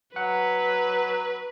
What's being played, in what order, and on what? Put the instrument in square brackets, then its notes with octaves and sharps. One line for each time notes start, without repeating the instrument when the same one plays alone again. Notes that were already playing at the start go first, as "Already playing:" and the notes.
[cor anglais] F#3 [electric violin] B4 [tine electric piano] F#5